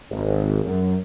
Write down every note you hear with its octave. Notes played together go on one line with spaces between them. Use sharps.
G#1
F#2